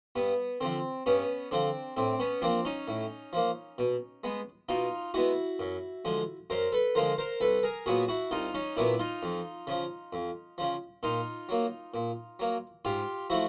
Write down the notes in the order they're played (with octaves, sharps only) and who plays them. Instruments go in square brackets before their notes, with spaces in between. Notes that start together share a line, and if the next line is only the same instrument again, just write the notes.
[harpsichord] G2 B3
D3 F3 C4
G2 B3 C#4
D3 F3 C4 D4
A2 C4 D4
B3 C#4
F3 A#3 C4 D4
C#4 D#4
A2
F3 A#3
B2
G#3 B3
B2 D#4 F4
G#3 B3 E4 F#4
F#2
D3 F3 G#3
F#2 A#4 C5
A4 B4
D3 F3 G#3 A#4 C5
A#4 C5
C2 A4 B4
G#4 A#4
A#2 F#3 B3 F#4 G#4
E4 F#4
C2 D#4 F4
C#4 D#4
A#2 F#3 B3 D4 E4
D#4 F4
F2
C#3 F3
F2
C#3 F3
A#2 D#4 F4
F#3 A#3
A#2
F#3 A#3
G#2 F4 G4
F3 A3 E4 F#4